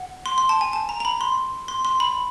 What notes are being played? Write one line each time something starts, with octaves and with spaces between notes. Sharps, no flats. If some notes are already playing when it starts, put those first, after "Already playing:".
Already playing: F#5
C6
C6
A5
G#5
A5
A#5
A#5
B5
C6
C6
C6
B5